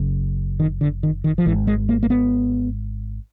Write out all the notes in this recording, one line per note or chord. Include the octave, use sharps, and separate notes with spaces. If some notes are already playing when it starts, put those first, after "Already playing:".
Already playing: F#1 F#2 C#3
D#3
D3
D#3
D#3
F3
G#1 G#2 E3
G#3
A#3
A#3
B3